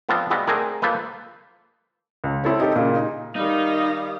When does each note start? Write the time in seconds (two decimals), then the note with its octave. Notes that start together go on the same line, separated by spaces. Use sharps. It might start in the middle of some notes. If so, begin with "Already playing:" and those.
0.09 F3 B3 C4 D4 F4
0.30 G3 G#3 B3 F#4 E5 F5
0.47 A3 C4 D4 G#4 A#4
0.82 A#3 F4 A4 B4 C5 D#5
2.24 C#2
2.44 C4 E4 A4 C#5
2.60 D#4 G4 A4
2.76 A#2 C#3
2.96 D#4
3.36 D#3 G3 D#4 F5 D#6